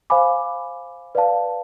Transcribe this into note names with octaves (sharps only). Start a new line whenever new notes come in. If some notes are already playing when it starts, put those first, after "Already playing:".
C5 F5 G#5 B5 D6
B4 D5 F5 A5